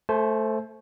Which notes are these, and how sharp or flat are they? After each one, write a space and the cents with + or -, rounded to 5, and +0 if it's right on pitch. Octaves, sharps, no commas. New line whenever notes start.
A3 +0 C5 +10 A5 -45